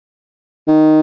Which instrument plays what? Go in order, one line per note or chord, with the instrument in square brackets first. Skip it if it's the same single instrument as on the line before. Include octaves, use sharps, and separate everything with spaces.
[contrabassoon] D#3